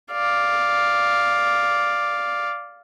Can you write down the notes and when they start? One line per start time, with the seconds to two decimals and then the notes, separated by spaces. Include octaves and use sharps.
0.12 D5 F5